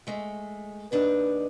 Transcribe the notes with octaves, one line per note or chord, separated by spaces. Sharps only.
G#3 A3
D#2 D4 D#4 B4